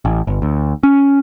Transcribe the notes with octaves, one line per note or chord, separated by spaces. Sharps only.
A1
G1
D2
C#4